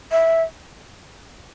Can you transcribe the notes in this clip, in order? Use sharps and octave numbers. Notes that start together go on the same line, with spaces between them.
E5